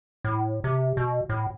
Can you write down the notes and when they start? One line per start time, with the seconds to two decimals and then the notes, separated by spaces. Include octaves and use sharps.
0.24 A2
0.64 C3
0.97 B2
1.29 A2